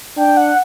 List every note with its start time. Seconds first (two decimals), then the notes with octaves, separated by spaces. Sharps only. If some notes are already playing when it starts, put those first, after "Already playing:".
0.17 D4 G5
0.37 F#5